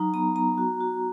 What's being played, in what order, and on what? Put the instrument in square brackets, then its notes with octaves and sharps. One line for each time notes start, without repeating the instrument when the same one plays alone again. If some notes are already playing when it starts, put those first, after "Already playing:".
Already playing: [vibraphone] F#3 D#4 A#5
B3 A#5
B3 A#5
F#4
F#4